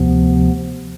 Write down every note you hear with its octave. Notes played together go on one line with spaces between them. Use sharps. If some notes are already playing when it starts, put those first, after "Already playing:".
Already playing: D2 C3 F3 B3